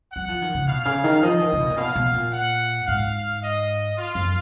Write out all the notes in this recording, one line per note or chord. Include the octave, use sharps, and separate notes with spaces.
F#3 F#5
F3
D#3
C#3
B2 F5
C#3
D#3
F3 D#5
D#3
C#3
B2
A#2
B2 F5
B2
A#2
F#5
G#2 F5
D#5
F4
F#2